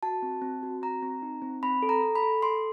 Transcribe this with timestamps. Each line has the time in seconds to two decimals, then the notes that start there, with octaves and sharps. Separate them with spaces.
0.03 F#4 A5
0.22 C4
0.42 C4
0.63 F#4
0.82 C4 A#5
1.02 C4
1.22 D#4
1.42 C4
1.63 C4 B5
1.83 A4
1.89 A#5
2.02 A4
2.15 B5
2.22 A4
2.42 A4 C6